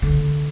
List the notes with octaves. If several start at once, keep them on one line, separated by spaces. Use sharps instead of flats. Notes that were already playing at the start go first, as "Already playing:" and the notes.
D3